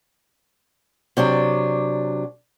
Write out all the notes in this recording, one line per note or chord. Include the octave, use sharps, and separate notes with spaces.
C3 F#3 D4